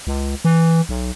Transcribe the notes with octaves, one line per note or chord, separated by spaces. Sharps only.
C#2
E3
B1